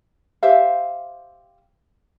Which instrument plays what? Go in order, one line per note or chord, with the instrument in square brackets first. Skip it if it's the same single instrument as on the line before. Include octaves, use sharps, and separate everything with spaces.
[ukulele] G4 C5 E5 F5